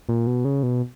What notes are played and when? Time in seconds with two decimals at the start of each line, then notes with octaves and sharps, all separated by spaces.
0.09 A#2
0.27 B2
0.45 C#3
0.63 B2